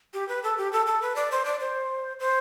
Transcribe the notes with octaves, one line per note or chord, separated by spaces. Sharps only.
G4
B4
A4
G4
A4
A4
B4
D5
C5
D5
C5
C5